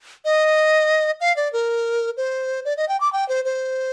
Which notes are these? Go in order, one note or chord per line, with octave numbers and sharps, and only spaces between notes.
D#5
F5
D5
A#4
C5
D5
D#5
G5
D6
G5
C5
C5